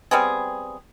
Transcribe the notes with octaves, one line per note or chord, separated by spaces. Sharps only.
G3 B3 C4 G#4